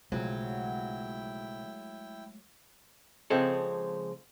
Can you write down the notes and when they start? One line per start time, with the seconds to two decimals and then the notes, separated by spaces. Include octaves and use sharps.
0.12 B1 C#3 F3 F#3 G#3 A3 E4 G5
3.30 C#3 F3 G#3 C4 G#4 A4